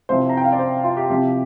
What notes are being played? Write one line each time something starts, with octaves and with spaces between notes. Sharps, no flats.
C2 C3 F3 C5
A#5
G5
F5
D5
C5
F4
G4
C2 C3 F3 G4